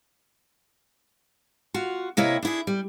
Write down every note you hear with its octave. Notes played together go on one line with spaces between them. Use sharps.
F4 F#4
C3 A#3 E4 C#5 D#5
D4 E4 G#4
G3